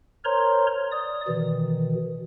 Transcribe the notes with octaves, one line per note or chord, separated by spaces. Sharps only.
A#4 C5 C#5 A#5 C6
D5 D#6
B2 D#3 E3